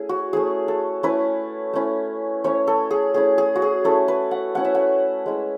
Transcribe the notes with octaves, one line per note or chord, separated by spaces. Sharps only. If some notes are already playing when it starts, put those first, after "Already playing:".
Already playing: A3 C#4 E4 G#4
F#4
A3 C#4 E4 G#4
A4
A3 C#4 E4 B4
A3 C#4 E4
A3 C#4 E4 C#5
A4
G#4
A3 C#4 E4 G#4
G#4
F#4
G#4
A3 C#4 E4 A4
B4
F#5
A3 C#4 E4 F#5
E5
F#5
G#3 C#4 E4